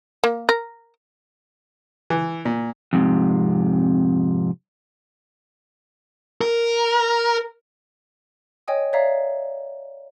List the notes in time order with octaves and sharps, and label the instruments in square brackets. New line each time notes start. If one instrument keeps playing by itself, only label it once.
[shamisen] A#3
A#4
[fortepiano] E3
A#2
[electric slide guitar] F2 G#2 C3
[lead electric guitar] A#4
[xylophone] C#5 D#5 G5 G#5 D#6
C#5 D5 E5 F5 A#5